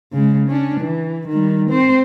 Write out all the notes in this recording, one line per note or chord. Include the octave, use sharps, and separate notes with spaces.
C#3 G#3
C#4 D4
E3
D#3 G3
C4 C5